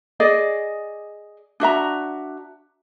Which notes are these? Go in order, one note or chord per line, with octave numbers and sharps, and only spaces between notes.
G#4 D5 D#5
D4 F#4 E5 A#5